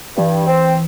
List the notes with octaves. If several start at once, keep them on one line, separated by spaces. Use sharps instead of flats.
G2 E3
C4